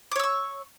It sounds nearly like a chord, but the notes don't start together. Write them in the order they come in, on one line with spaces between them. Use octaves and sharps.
D6 C#5 E6 C#6